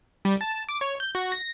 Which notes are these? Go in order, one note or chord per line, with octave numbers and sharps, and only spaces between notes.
G3
A5
D6
C#5
G6
F#4
A#6